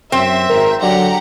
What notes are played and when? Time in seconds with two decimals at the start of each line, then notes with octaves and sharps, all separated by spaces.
0.12 F#2 C4 E5
0.49 G#1 A#4
0.82 D3 F#3 G4 F#5 A#5